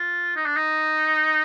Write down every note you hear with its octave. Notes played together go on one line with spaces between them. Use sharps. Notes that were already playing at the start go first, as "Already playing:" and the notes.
Already playing: F4
D#4
D4
D#4